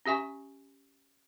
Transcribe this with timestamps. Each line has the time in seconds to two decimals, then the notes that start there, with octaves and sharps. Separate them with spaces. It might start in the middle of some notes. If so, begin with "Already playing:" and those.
0.06 C#4 G4 E5 G#5 C#6